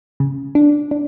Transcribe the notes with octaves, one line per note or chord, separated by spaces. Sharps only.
C#3
D4
D4